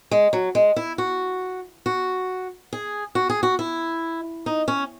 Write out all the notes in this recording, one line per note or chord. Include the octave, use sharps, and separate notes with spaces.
G#3
F#3
G#3
E4
F#4
F#4
G#4
F#4
G#4
F#4
E4
D#4
C#4